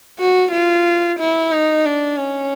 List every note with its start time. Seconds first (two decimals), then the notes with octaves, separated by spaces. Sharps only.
0.19 F#4
0.52 F4
1.19 E4
1.52 D#4
1.86 D4
2.19 C#4